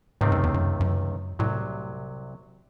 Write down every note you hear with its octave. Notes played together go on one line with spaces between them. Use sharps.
C#2 G#2 C3 D#3 A3 C4
F#2
E2
F#2
F#2
C2 A2 C3 F#3